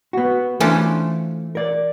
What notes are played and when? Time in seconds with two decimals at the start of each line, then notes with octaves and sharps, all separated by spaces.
0.13 B3 F#4
0.60 E3 A3 C#4 D4 F4 C5
1.55 A#4 D5